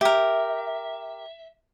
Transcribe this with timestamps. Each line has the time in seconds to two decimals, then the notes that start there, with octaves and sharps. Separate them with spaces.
0.01 G4 A#4 E5